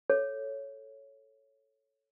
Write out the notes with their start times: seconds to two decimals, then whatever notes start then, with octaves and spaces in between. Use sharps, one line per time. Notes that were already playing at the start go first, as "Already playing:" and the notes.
0.10 A4 C#5